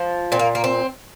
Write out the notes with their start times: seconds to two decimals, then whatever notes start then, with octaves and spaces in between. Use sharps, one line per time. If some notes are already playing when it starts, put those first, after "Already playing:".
Already playing: F3
0.32 A#2 C4
0.39 A#3
0.55 A#3
0.64 C4